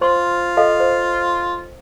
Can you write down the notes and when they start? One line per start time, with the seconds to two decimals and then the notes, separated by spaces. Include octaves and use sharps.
0.01 F4 C5 C6
0.57 A4 D#5 F5
0.80 C5